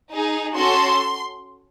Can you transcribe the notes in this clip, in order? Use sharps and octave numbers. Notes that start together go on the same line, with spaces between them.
D#4 G#4
C#4 F#4 A4 C6